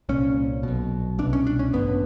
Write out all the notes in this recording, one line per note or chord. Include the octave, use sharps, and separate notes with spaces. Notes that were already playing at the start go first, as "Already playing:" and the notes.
C2 A#2 C#4
B1 B2
C2 B2 D4
C#4
D4
C#4
A1 G2 D3 B3